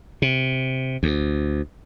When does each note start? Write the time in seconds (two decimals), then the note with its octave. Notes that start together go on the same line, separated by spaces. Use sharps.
0.22 C3
1.03 D2